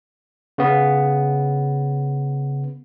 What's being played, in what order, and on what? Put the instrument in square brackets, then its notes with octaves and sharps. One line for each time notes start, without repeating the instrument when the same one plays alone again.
[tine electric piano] C#3 B3